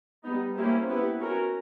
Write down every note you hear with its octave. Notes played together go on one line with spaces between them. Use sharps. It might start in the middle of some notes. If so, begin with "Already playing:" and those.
G3 B3 D#4
A#3 C#4 E4 G4 C5
B3 E4 G4 B4
C#4 F#4 A#4